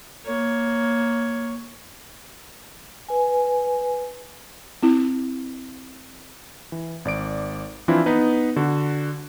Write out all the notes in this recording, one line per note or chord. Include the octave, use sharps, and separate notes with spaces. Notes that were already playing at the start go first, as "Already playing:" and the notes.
A#3 C#5
B4 G#5
C4 E4
E3
G#1 D5 D7
E3 F3 C4 D4 E4 F4
B3 D#4 B4
D3 F#4